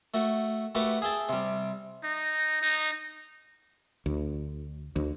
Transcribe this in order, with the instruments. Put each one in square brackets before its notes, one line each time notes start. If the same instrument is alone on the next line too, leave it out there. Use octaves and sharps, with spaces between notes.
[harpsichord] A3 F#4
A3 F#4 G4 B4 F#5
G#4 E5 G5 A5
C3 G3
[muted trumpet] D#4
D#4
[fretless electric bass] D2
D2